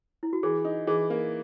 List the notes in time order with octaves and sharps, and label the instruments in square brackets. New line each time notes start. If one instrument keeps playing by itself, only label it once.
[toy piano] E4
F#4
[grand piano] E3 [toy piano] G#4
[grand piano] D#4
[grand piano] E3 [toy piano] G#4
[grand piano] A#3